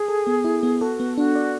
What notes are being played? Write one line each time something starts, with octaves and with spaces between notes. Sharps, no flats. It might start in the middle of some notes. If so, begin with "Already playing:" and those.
Already playing: G#4
A4
B3
E4
B3
F#4 A4
B3
D4 F#4
D5